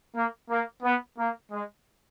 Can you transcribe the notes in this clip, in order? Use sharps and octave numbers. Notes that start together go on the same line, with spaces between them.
A#3
A#3
B3
A#3
G#3